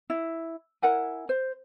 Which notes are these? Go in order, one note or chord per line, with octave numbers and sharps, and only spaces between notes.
E4
E4 A#4 F#5 G#5
C5